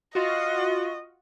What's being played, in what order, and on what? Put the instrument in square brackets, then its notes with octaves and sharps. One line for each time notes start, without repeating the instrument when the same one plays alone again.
[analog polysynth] F4 F#4 [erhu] D#5